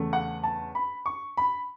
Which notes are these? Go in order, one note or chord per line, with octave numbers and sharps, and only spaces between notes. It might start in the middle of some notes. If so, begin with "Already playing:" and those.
Already playing: E2 C#3 A3
F#5
A5
B5
C#6
B5